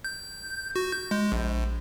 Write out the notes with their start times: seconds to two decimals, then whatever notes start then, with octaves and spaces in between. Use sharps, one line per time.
0.04 G6
0.76 F#4
0.92 G6
1.11 G#3
1.32 A#1